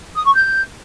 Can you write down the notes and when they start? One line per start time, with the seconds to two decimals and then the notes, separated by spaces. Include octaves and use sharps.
0.16 D#6
0.26 C#6
0.36 G6